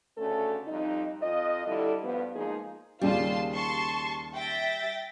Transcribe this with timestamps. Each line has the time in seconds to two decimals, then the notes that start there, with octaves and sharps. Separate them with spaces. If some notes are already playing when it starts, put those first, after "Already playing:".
0.17 D2 C#3 A3 C#4 A4
0.68 F2 G3 D#4
1.21 F2 F4 D#5
1.67 D3 G3 E4 A4
2.04 G2 F3 B3
2.35 F3 G#3 A#3 D#4 G#4
3.01 D#2 C#3 G3 F4 D5 A5 C6
3.54 A5 C6 C#6
4.35 E5 G5 A6 A#6